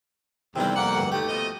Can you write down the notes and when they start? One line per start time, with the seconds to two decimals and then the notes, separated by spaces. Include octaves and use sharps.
0.56 E2 C3 D#3 G3
0.76 F2 A#3 F#5
0.95 D2 G2
1.12 D#2 A3 G4
1.28 B2 F3 D#5